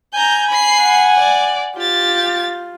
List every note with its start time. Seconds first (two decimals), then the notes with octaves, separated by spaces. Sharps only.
0.14 G#5 A#5 G6
0.50 B5 C7
0.81 F#5
1.19 D5
1.78 F4 G4 A6